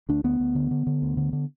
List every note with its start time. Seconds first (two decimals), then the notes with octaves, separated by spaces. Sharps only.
0.09 D2 D4
0.24 D2 B3
0.40 D2
0.55 D3
0.71 D3
0.87 D3
1.02 D2
1.17 D3
1.33 D3